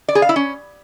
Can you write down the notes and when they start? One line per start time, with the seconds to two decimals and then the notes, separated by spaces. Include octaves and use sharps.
0.08 D5
0.15 G#4
0.22 F5
0.29 E4
0.36 C#4